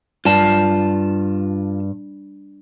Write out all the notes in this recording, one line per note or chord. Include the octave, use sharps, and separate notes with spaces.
G2 F4 A5